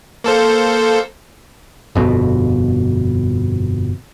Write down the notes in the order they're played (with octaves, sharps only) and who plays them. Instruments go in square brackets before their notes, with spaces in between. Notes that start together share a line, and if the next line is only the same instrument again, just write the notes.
[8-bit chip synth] A#3 A4 C5
[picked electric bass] G1 F2 B2